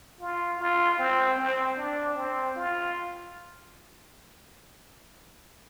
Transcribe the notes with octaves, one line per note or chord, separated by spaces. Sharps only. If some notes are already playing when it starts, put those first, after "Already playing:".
F4
F4
C4
C4
D4
C4
F4